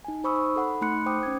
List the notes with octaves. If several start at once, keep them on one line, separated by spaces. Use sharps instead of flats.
D#4 G#5
D#4 C5 B5 C#6 D#6 E6
A4 F#5 B5
A3 D#4 B5 C6 F#6 C#7
C5 G5 D6 D#6
C#4 G#6